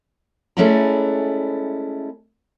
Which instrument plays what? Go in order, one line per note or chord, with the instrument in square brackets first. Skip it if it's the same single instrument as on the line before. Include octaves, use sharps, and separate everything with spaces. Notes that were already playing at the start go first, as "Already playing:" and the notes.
[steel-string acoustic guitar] G#3 A3 C#4 E4 D5 A#5